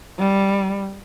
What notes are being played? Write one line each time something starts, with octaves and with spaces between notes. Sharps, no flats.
G3